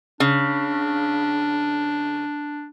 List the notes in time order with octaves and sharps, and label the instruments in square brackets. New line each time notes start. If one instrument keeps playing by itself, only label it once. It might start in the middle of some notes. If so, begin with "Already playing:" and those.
[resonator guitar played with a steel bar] C#3 [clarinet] D4